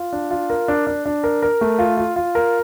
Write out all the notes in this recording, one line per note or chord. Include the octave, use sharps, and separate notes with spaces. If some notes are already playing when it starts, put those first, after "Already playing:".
Already playing: F4
D4
F4
A#4
D4
D4
D4
A#4
A#4
A3
F4
F4
F4
A#4